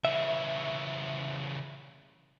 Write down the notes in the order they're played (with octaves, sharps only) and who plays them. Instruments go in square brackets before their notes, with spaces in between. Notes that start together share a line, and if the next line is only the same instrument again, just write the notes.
[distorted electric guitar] C#3 E3 [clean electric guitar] E5